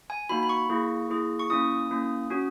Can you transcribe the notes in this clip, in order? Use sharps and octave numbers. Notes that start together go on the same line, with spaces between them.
G#5
A#3 D#4 F#4 B5
B5
C#6
A#3 E4 G#4
A#3 E4 G#4
C#6
A#3 C#4 E4 D#6
A#3 C#4 E4
C#4 F#4